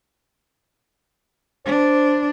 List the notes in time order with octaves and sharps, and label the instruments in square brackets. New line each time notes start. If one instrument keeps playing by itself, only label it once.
[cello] D4 [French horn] C5